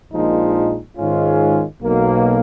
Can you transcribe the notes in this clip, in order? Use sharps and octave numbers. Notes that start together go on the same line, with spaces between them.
A#1 A#2 F3 G#3 D#4
G#2 D#3 G#3 C#4 F4
B1 B2 A#3